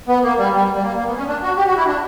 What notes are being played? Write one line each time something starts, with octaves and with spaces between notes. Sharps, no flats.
B3
A#3
G3
G3
G3
A#3
A#3
B3
C#4
D4
F#4
G4
F#4
E4
D4